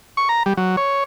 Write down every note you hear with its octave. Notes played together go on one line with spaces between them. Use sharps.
C#6
A#5
G3
F#3
C#5